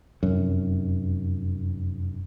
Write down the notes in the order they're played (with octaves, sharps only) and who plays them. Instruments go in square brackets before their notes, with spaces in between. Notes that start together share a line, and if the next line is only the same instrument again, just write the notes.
[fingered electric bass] F1 F#2